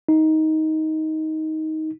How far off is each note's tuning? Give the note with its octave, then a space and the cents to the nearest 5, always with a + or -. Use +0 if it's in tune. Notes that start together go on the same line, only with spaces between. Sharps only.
D#4 +15